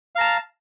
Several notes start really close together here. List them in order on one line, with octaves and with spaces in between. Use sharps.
F5 A#5 A5